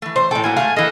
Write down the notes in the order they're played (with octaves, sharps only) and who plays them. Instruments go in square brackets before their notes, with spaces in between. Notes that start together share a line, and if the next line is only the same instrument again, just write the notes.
[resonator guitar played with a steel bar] E3 A3
[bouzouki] C5
[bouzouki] A2 G5 [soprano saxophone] A4
[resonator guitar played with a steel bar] A#3 E4 F#4 [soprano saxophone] G#5
[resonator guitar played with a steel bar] G#2 D#3 F5 [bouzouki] A3
[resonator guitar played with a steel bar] E3 A#3 [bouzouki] A4 [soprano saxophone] D#5